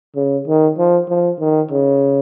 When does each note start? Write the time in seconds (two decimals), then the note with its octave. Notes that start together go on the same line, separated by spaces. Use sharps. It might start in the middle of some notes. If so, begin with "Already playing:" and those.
0.16 C#3
0.48 D#3
0.78 F3
1.09 F3
1.40 D#3
1.71 C#3